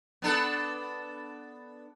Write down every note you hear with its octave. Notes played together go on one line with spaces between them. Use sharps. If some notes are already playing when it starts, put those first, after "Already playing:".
B3 D4 A4